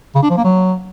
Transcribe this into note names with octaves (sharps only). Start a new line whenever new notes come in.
C#3
D4
F3
A#3
F#3